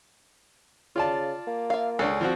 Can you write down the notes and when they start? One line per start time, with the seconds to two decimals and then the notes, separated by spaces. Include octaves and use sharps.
0.96 C#3 F4 D5 A5
1.47 A#3
1.70 E5 F5
1.99 C#2 D4 G#4 A4
2.21 F3 C4 F#4